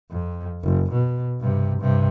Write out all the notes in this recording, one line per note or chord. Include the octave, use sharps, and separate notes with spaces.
F2
F#1
B2
G2 C3
G2 C3